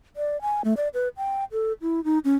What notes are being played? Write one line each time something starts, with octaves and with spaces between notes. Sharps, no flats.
D5
G#5
A3
D5
B4
G5
A4
E4
D#4
C#4